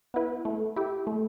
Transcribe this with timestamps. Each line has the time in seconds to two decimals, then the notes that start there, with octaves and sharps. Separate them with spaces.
0.14 B3 E4 B4
0.45 A3
0.76 E4 G4
1.07 A3